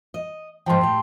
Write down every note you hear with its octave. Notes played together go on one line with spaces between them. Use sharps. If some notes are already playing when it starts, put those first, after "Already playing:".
D#5
G#2 F3 G5 A5 C6
A2 G4